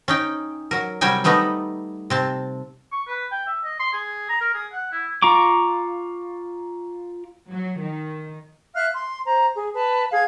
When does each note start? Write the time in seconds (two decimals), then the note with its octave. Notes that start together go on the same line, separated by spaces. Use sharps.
0.08 C#4 D#4 G5
0.71 F#3 A#4
1.01 C3 F#3 G3 A#4 G5 G#5
1.24 G3 A3 B3 D#4 D#5
2.10 C3 C4 A5
2.92 C#6
3.07 B4
3.31 G5
3.47 E5
3.64 D#5
3.79 C6
3.93 G#4
4.29 A#5
4.41 A#4
4.54 G#4
4.72 F#5
4.92 E4
5.22 F4 A#5 C#6 D6
7.50 F#3
7.80 D#3
8.74 E5 F5 F6 F#6
8.92 C6
9.25 C5 A#5
9.54 G#4
9.73 B4 A5
10.12 G#4 F5 G#6